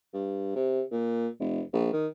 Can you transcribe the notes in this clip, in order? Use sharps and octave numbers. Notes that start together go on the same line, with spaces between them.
G2
C3
A#2
F1
A#1
D#3